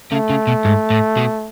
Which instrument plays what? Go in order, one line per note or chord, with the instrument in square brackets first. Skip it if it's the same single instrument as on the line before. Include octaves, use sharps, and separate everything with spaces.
[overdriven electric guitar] C#3 [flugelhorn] A3
[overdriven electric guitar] C#3
B2
G#2
A2
B2